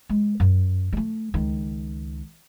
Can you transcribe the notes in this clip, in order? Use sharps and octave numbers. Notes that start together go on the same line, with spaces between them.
G#3
F#2
G#3 A3
C#2 D#3